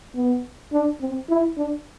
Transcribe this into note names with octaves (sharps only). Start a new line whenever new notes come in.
B3
D4
C4
E4
D4